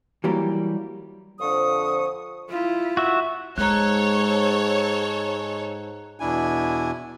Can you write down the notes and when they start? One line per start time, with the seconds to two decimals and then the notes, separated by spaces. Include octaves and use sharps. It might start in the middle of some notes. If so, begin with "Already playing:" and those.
0.24 E3 F#3 G3 A#3 G4 A#4
1.40 F2 D3 F3 C#6 D#6
2.49 E4 F4
2.97 F#4 E5
3.58 G#2 G#3 A4 C#5 A#5 F#6
6.20 E2 B2 D4 E4 G#5